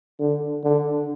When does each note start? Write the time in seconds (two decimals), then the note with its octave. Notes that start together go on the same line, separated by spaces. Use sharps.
0.20 D3
0.64 D3